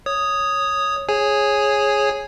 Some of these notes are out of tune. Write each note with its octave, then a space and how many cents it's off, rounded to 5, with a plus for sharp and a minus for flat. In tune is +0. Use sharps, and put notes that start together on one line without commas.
C#5 +0 D#6 +0
G#4 +0 C#5 -10 G#5 +0